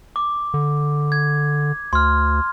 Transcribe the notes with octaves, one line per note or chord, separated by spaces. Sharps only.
D6
D3
G#6
D2 C6 F6